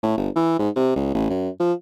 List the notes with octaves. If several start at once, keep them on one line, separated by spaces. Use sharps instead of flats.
A2
G1
E3
G#2
C3
C#2
A1
F#2
F3